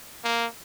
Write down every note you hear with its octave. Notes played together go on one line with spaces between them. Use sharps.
A#3